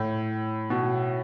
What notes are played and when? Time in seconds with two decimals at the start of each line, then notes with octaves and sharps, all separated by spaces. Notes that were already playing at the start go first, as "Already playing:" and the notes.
Already playing: A2
0.70 B2